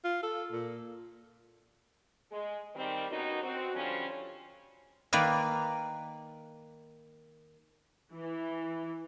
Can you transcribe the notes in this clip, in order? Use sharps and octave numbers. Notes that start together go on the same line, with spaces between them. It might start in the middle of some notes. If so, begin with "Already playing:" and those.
F4
A4
A#2
G#3
D#3 G3 C4
F#2 B2 F#3 D#4
C4 F#4
D3 F3 G3 C4 C#4
D#3 A#3 B4 D5 F5
E3